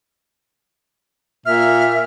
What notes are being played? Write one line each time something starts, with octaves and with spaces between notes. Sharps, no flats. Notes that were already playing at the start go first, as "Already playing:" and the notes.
A#2 E5 F6